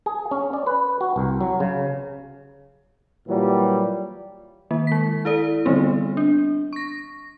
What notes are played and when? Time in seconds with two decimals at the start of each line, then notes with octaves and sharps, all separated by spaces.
0.06 G#4
0.31 C#4
0.53 D5
0.67 B4
1.01 F#4
1.16 C2
1.41 F#3
1.60 C#3
3.28 A#2 E3 F#3 G3
4.71 D#3 A#3
4.87 G#3 B6
5.25 E4 A4 D5
5.66 D3 E3 G3 B3 C4
6.17 D4
6.73 C#6 A#6